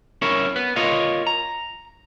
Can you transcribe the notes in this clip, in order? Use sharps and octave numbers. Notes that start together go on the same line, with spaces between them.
C#4 E4 A#4 C#5
B3 B4
F4 A#4 C#5 D#5 F5
A#5